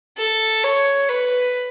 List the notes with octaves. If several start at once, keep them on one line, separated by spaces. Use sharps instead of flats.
A4
C#5
B4